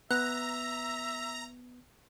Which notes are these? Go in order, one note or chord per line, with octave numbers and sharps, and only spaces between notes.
B3 E5 A#5 F#6